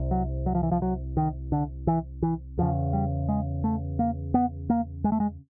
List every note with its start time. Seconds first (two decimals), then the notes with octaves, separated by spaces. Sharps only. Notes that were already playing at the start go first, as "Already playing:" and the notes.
Already playing: C2 C3
0.11 F#3
0.46 F#3
0.55 F3
0.63 E3
0.71 F3
0.82 F#3
1.17 D#3
1.52 D3
1.87 E3
2.22 E3
2.58 E2 C#3 F3
2.93 G3
3.29 G#3
3.64 A3
3.99 A#3
4.34 B3
4.70 A#3
5.04 G#3
5.12 A3
5.20 G#3